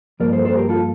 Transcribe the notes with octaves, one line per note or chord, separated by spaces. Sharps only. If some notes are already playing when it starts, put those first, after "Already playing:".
G2 F3 A#3 A#4 D5
A4 C5
A4 C5
G4 A#4
F4 A4